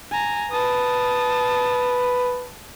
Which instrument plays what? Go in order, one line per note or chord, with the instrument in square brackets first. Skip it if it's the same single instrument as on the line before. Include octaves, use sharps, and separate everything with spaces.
[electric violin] G#5 A#5
[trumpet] B4 [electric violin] A5 D#6